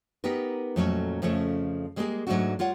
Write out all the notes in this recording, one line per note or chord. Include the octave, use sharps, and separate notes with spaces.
B3 D#4 G4 A#4 B4
F2 A#2 F#3 A3 C4 C#4
F2 C#3 F3 A3 C#4
G3 G#3 A#3 B3 G4 G#4
G#2 F#3 G#3 A3 D4 F#4
G3 F4 C#5 F#5